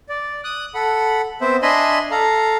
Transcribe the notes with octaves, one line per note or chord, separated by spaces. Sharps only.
D5
D#6 F#6
A4 F#5 B5
B3 C4 C5 E5
D4 D#5 E5 G#5 B5 C6
A4 F5 A#5